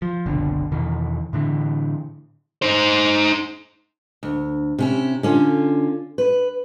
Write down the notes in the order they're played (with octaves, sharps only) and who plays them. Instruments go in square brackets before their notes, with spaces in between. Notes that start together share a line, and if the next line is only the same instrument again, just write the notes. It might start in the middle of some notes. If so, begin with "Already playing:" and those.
[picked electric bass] F3
F#1 C2 B2 D3
E2 B2 D#3 E3
A2 D3 E3
[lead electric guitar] D#4 C5
[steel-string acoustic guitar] D2
C3 C#4 E4
D3 C#4 F4
B4